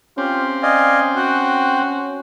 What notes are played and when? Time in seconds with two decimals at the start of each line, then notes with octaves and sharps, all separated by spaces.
0.18 C4 C#4 F4 G4
0.63 D5 D#5 F5 G#5
1.16 F#4 G5 F#6